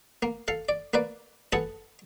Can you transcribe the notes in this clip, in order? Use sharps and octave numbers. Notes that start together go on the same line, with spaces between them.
A#3
A4 F5
D5
A#3 B4 D5
G#4 A4 B4 F#5 A5